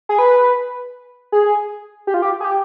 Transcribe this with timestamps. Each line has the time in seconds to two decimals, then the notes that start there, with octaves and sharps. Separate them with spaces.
0.09 G#4
0.19 B4
1.32 G#4
2.07 G4
2.14 F4
2.22 G4
2.40 G#4
2.44 G4